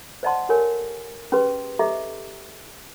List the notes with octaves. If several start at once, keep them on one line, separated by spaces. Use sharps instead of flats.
C5 D5 D#5 F#5 A5 C6
G4 A4 A#4 C#5 G#5
C#4 G4 G#4 B4 C6
G4 A4 D#5 E5 A#5 D6